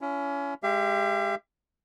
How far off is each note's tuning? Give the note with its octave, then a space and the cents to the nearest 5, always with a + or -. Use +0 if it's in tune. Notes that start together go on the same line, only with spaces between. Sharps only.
C#4 +25 E4 +40
G#3 +0 G4 +15 F5 -45